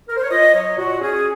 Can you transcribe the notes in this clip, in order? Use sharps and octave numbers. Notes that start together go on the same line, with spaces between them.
A#4
C5
C#5
F4 D#5
F#3 C#5
A#2 F#4
C#4 G#4